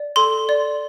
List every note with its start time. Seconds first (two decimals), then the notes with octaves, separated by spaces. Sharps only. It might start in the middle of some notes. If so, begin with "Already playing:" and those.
Already playing: D5
0.16 A4 C6
0.49 D5